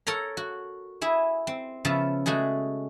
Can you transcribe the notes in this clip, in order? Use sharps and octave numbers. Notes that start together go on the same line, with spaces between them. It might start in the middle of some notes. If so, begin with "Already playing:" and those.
A4 A#4 C#5 A#5
F#4
E4 G#4 E5
C4
C#3 F3 B3 E5 A5
G#3 A3 F#4 G#4